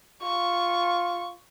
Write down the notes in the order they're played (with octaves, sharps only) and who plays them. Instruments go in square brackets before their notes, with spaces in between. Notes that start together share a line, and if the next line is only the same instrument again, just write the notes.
[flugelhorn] F4 [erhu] C#6